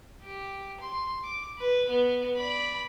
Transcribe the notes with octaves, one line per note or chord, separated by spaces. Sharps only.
G4
C6
D6
B4
B3
D5 B5